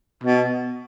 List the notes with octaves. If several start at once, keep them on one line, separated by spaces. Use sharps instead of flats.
B2